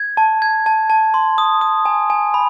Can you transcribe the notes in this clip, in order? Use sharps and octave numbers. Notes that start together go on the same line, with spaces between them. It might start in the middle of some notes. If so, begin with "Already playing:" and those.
Already playing: G#6
A5
G#6
A5
A5
C6
D#6
D#6
G#5
G#5
B5